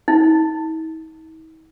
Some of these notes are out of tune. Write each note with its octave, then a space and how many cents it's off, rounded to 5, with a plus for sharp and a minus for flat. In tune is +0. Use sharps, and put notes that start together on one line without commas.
D#4 +45